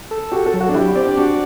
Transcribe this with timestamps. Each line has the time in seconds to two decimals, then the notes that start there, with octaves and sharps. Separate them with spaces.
0.11 A4
0.32 F#4 G4
0.46 A4
0.53 F#3
0.61 F#4
0.69 D4
0.75 E4 G4
0.95 C4 D5
1.07 D4
1.17 D4 F#4